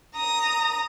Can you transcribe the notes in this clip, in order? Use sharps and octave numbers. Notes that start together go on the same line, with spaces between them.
A#5 D#6